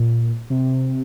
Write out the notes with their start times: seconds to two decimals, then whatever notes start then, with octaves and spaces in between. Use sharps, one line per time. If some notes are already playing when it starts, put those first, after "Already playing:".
Already playing: A#2
0.50 C3